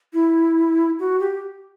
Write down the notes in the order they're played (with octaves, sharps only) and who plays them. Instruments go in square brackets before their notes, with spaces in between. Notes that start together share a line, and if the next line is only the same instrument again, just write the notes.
[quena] E4
F#4
G4